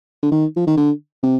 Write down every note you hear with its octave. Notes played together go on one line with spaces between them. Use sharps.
D3
D#3
F3
D#3
D3
C3